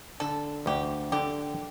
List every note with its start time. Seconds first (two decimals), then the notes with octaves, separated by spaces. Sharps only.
0.20 D3 A4
0.66 D2 G4
1.12 D3 G4